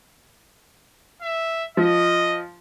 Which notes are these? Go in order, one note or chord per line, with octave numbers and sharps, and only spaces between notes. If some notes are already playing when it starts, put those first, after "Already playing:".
E5
F3 D#5